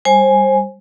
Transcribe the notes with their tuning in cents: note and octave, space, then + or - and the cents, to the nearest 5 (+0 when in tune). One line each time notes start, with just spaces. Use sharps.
G3 +15 C5 +25 G#5 +0